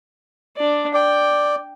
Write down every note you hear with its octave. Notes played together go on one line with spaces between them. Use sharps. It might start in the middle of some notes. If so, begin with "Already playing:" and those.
D4 D5
D5 G5